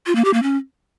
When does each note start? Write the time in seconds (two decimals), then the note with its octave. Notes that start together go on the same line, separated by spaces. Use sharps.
0.06 F4
0.15 A#3
0.25 G4
0.34 A#3
0.43 C#4